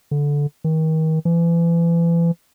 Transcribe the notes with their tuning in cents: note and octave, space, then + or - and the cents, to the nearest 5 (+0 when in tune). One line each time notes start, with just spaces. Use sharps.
D3 -15
D#3 +35
E3 +35